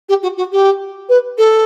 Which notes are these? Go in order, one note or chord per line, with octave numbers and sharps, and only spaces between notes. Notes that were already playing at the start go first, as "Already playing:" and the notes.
G4
F#4
F#4
G4
B4
A4